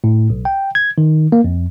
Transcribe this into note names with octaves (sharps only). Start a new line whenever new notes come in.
A2
B1
G5
G#6
D#3
A#3
F2